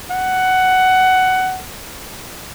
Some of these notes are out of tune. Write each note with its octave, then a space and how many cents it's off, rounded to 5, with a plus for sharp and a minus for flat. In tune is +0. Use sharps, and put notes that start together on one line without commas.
F#5 +10